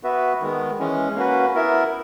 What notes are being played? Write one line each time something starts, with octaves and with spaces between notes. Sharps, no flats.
B3 F#4 B4 E5
D#3 G#3 B3
E3 G#3 C#4
A#3 C#4 F#4 B4
B3 E4 A#4 E5